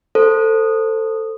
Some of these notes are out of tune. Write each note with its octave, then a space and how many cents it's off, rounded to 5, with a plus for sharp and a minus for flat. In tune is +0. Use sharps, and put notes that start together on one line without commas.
A4 +15 C5 +0